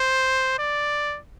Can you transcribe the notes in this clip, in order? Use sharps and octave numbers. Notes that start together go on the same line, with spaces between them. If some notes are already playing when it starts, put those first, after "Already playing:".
Already playing: C5
D5